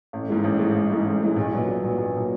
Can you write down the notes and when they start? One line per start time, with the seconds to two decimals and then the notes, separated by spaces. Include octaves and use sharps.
0.13 A1
0.28 G#2 E3 G#3
0.44 A1
0.59 G#2 E3 G#3
0.74 A1
0.90 G#2 E3 G#3
1.05 A1
1.21 G#2 E3 G#3
1.37 B1
1.52 A#2 F#3 B3 D4
1.68 B1
1.83 A#2 F#3 B3 D4
1.98 B1
2.14 A#2 F#3 B3 D4